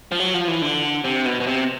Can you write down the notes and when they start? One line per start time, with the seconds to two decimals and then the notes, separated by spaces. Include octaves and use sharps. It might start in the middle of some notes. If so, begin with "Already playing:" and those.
0.12 F3
0.20 F#3
0.34 F3
0.48 E3
0.62 D3
1.04 C3
1.26 B2
1.41 B2
1.47 C3